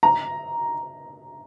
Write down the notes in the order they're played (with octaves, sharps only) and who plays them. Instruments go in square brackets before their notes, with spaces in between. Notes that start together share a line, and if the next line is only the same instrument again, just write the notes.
[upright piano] A#5